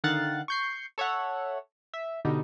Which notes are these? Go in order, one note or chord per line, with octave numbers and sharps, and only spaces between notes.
D3 D#3 F5 F#5 F#6 A6
C#6 G6 C7
A4 C#5 E5 F#5
E5
B2 D3 G3 D#4